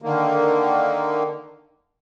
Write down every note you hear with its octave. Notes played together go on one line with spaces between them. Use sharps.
D3 D#3 A#3